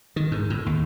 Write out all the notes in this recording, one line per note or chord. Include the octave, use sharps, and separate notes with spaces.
D#3
G#2
A2
D#2